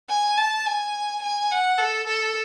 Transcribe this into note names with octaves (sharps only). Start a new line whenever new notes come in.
G#5
A5
G#5
G#5
F#5
A4
A4